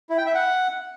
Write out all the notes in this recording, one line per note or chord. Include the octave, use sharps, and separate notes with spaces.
E4
G5
E5
F#5